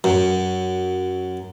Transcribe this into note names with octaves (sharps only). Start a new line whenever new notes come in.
F#2